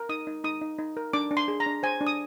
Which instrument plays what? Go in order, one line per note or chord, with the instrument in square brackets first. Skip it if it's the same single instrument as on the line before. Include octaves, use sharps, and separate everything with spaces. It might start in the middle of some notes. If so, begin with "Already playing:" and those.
Already playing: [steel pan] A#4
D#4 D#6
D#4
D#4 D#6
D#4
D#4
A#4
D4 D6
D4
C6
G#4
A#5
D4
C5 G#5
D4
D#6